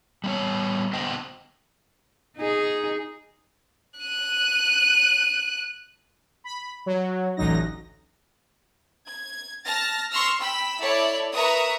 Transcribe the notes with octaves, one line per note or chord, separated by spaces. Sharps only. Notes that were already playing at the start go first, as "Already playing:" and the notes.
G3 B3 C#5
D3 B3 C5 D#5 G5
D#4 G#4
F#6 D#7
B5
F#3
A1 D2 F#3 D#4 A#6
G#6
A5 F6 A6 A#6
C6 C#6 E6 F6 A#6
G5 B5 E6 B6
E4 A4 C#5 D5
A#4 B4 E5 A#5 C#6 D#6